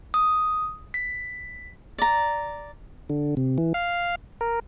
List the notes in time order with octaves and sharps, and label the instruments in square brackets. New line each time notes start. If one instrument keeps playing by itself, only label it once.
[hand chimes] D#6
B6
[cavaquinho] D5 A#5
[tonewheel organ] D3
C3
E3
F5
A#4